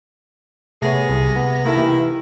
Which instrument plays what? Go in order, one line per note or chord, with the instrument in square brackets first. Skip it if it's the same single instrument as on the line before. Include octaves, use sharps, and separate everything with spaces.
[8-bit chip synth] C3 A#6 [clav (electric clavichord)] A3 B3 C#5 [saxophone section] G#4
[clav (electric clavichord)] C2
B3
[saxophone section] D#3 E4 [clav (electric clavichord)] A#3 A4
[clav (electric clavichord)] E3 G4